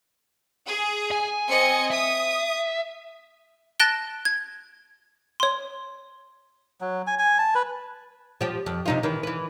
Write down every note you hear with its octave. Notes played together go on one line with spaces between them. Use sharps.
G#4
G#5
C4 D#5 C#7
E5 D#6
A5 F#6 A6 A#6 D7 G7
G#6
C#5 C6
F#3
G#5
G#5
A5
B4
F3 G4
F2
C3 D#4 F4
D#3 E3
E3 B4